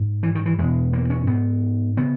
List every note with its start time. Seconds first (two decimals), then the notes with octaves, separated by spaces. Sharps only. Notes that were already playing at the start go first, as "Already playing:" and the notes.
Already playing: G#2
0.23 E3
0.35 D#3
0.46 E3
0.58 E2 B2 G#3
0.93 A#3
1.10 C#4
1.26 G#2 B3
1.97 C#3 B3